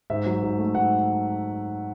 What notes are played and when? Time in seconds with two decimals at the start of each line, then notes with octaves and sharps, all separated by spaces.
0.10 G#2 E5
0.26 F#3
0.42 G#2
0.58 A3
0.75 G#2 F#5